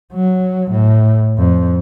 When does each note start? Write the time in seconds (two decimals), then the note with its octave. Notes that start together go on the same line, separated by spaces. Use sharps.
0.12 F#3
0.72 A2
1.38 F2